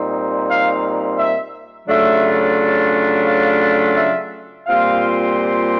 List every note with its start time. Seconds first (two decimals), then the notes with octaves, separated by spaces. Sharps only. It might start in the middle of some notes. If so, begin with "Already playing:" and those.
Already playing: A#2 G3 C4 D#4
0.49 F5
1.19 E5
1.88 C#3 F#3 A3 D4 F4 E5
3.27 F5
3.97 E5
4.66 A#2 G3 C4 F4 F5